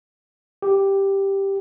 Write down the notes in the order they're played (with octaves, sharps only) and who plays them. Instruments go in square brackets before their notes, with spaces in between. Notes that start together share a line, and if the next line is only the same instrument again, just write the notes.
[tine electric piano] G4